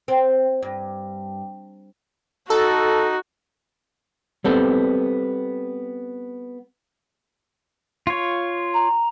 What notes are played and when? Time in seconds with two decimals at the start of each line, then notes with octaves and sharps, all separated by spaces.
0.08 C4
0.63 G2
2.50 D#4 F#4 A4
4.44 G3 B3 C4 A4
8.07 F4 C#5
8.73 A#5